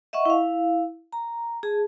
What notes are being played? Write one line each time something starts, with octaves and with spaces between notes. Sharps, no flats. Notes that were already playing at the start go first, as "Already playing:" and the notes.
D#5 E5 F#5 C#6
E4 F5
A#5
G#4 A5